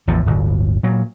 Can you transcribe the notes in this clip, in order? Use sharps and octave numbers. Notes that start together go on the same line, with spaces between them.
A1 E2 A2 F3
D1 G1
A#2 F#3